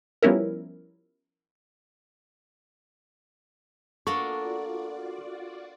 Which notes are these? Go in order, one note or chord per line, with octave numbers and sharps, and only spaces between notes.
F3 G3 B3 C#4 E4 A#4
A#3 B3 D4 F4 F#4 A4 D5 C#6